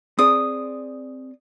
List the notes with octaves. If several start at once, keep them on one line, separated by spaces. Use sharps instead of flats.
C4 G#4 D5 D#6